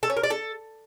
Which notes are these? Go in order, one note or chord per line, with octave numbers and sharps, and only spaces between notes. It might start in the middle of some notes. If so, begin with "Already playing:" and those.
A4
C#4
A#4
D5
A4